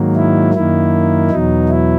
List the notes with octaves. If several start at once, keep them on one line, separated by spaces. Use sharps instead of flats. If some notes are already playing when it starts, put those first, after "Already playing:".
Already playing: G#2 D#3 F#3 A#3
E4
F#2 D#3 A#3 E4
E2 B2 F#3 D#4
E4